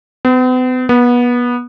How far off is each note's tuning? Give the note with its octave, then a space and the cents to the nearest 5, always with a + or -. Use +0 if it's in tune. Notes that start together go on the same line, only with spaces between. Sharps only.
B3 +45
B3 -25